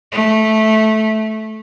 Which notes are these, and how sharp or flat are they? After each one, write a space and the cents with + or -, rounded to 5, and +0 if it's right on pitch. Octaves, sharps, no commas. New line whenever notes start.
A3 -10